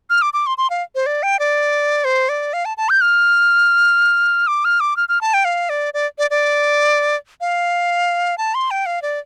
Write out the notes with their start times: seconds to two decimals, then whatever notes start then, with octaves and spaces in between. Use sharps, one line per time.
0.10 F6
0.22 D6
0.33 D6
0.47 C6
0.58 C6
0.70 F5
0.95 C5
1.06 D5
1.23 G5
1.39 D5
2.05 C5
2.29 D5
2.53 F5
2.65 A5
2.77 A5
2.89 G6
3.01 F6
4.47 D6
4.65 F6
4.80 D6
4.97 F6
5.09 F6
5.21 A5
5.34 G5
5.45 F5
5.69 D5
5.94 D5
6.18 D5
6.30 D5
7.41 F5
8.38 A5
8.55 C6
8.71 G5
8.86 F5
9.02 D5